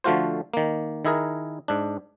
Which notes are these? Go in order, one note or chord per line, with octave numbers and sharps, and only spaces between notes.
D3 F3 A3 F4 F#4 C5
D#3 A#3
D#3 E4 G#4 A#4
G#2 D4